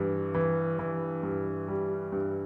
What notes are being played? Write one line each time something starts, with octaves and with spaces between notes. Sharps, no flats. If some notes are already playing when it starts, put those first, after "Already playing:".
Already playing: G2 E3
E3
E3
G2
G3
G2